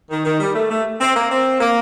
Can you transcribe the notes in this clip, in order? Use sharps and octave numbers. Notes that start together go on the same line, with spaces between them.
D#3
D#3
G3
A3
A3
C4
A#3
C4
A#3